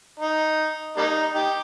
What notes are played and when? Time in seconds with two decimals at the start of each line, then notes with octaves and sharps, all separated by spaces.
0.20 D#4
0.97 G3 A#3 D#4
1.35 D#4 G4